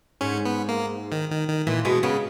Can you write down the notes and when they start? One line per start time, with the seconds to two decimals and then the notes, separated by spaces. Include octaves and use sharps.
0.21 G#2 C#4
0.45 B3
0.69 A#3
1.12 D#3
1.31 D#3
1.49 D#3
1.67 A#2 E3
1.85 B2 G#3
2.03 C#3 B3